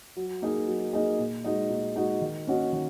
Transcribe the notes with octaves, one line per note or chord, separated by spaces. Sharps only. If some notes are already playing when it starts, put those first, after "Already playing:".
F#3
A#3 D#4 G#4 D#5
F#3
A#3 D#4 G#4 D#5
A#2
G#3 D#4 F#4 D#5
A#2
G#3 D#4 F#4 D#5
D#3
A#3 C#4 F#4 D#5
D#3